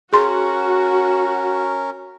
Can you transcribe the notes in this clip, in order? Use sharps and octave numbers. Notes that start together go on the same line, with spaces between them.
C#4 F#4 G#4 A#4 C6